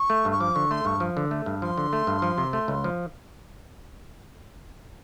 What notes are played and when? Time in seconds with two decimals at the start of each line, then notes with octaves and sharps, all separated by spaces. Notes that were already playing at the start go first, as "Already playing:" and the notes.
Already playing: C#6
0.10 A3
0.25 G2
0.31 C#6
0.40 F3 D6
0.55 D3 C#6
0.71 A3 C6
0.85 G2 C#6
1.00 F3
1.17 D3
1.31 A3
1.46 G2
1.62 F3 C6
1.78 D3
1.93 A3
2.07 G2
2.22 F3
2.38 C3
2.53 A3
2.68 C#2
2.84 F3